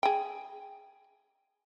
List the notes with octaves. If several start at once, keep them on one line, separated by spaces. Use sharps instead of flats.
G#4 G5